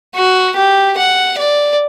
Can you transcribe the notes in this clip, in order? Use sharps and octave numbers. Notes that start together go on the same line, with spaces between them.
F#4
G4
F#5
D5